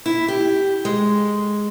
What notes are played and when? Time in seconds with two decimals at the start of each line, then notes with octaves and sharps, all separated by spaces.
0.06 E4
0.28 G4
0.85 G#3